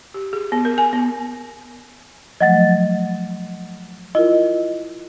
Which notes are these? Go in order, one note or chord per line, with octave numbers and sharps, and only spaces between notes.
G4
G#4
B3
A#4
G#5
B3
F3 F#3 A3 D#5 F#5 A6
E4 F4 A#4 D#5